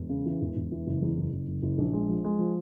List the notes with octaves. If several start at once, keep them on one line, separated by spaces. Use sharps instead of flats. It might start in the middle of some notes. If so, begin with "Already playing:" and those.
Already playing: E1
C#3
E3
E1
E1
E3
F#1
E2
F#1
F#1
F#1
F#1
A#1
G#3
F3
G#3
F3